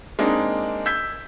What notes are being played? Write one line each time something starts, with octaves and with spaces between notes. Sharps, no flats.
G#3 A#3 C4 D4 D#4
E6 G6 G#6 B6